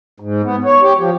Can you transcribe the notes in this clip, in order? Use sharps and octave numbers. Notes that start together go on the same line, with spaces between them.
G#2
B3
C#5
G4
F3